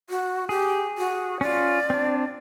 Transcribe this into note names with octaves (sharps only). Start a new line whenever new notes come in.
F#4
G4 G#4
F#4
C#4 F4 D5
C4 D4